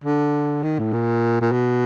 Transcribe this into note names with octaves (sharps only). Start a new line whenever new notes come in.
D3
D#3
A2
A#2
A#2
B2